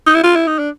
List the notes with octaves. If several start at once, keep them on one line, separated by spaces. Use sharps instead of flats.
D#4
E4
F4
E4
D#4
D4